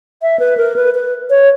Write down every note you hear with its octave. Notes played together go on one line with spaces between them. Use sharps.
E5
B4
A#4
B4
B4
C#5